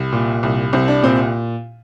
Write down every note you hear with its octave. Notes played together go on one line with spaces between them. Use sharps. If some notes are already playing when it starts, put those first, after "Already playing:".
Already playing: C2
A#2
C2
C2 C4
D4
A#2 C4